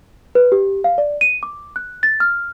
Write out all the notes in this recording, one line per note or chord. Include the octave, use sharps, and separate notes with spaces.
B4
G4
F5
D5
D#7
D6
F#6
A6
F6